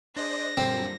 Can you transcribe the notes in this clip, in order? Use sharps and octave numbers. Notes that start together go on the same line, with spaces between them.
D4 G#4 C5 D5 D#5 A#6
F#2 A#2 D3 G3 C4 C5